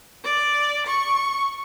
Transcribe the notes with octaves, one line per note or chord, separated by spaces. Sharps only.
D5
C#6